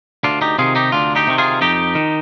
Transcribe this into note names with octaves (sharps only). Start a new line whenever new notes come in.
D2 D4 F4
D#4 G4
C3 D#3 F4 G#4
D#4 G4
D2 D4 F4
D#4 G4
C3 D#3
F4 G#4
F2 D#4 G4
D#3